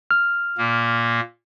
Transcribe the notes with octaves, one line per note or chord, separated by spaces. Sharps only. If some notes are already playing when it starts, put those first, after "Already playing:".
F6
A#2 A#3